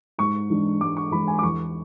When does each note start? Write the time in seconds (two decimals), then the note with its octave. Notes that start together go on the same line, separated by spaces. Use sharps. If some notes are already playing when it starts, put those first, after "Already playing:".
0.18 G#2 C#6
0.50 E3 G#3 D4
0.81 G#2 D6
0.97 C#6
1.11 E3 G#3 D4 B5
1.27 G#5
1.39 D6
1.43 E2 C#6